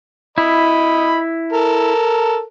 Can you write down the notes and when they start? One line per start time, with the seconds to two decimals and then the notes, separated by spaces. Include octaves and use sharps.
0.38 E4 D#5 B5
1.52 A4 A#4